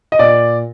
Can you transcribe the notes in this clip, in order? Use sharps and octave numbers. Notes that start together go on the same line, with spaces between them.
D#5
A#2 D5